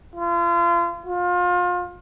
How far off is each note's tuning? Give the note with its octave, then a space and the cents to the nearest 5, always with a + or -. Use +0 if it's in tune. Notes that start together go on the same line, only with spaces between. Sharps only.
F4 -35
F4 +30